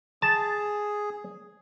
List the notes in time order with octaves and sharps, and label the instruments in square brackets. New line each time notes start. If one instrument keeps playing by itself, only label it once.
[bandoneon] G#4 [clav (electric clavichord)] A5